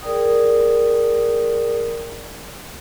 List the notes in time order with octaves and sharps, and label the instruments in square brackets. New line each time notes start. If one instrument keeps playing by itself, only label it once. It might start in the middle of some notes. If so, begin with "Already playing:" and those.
[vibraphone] G#4 A#4 D5 G5 D#6